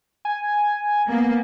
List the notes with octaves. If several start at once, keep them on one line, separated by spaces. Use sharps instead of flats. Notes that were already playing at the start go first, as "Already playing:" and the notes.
G#5
A#3 B3